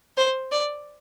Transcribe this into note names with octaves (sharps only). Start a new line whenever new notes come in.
C5
D5